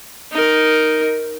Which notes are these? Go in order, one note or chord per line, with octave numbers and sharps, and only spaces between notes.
D#4 A#4